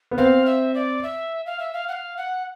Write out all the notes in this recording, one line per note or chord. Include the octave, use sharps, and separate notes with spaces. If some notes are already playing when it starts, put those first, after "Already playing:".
B3
C4 F5
E5
D5
E5
F5
E5
F5
F#5
F5
F#5